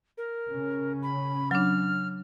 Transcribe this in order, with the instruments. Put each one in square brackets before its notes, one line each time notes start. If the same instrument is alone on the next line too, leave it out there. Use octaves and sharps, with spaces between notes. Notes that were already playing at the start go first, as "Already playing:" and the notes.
[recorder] A#4
[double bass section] C#3 C#4
[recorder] B5
[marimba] F#3 D4 [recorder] F6